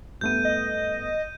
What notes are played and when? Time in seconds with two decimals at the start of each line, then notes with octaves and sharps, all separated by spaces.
0.21 G2 A3 B3 G6 D#7
0.45 D#5